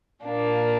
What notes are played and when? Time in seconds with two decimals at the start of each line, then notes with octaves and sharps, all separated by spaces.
0.23 A#2 A#3 D4